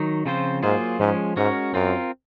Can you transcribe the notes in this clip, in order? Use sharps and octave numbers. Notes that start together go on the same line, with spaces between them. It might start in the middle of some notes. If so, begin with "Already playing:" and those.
Already playing: D#3 F#3 D#4
C#3 F3 C4 F4 C5
G#2 F#3 A#3 F4 G#4 C5
G#2 F3 G#3 C#4
G#2 G#3 C#4 F#4 A#4
F#2 C4 F4 A#4